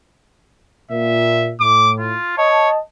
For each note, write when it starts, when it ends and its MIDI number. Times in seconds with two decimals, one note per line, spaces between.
0.91 1.53 46
0.91 1.52 76
1.60 2.14 45
1.60 1.91 86
1.99 2.34 65
2.38 2.70 73
2.38 2.79 75
2.38 2.79 81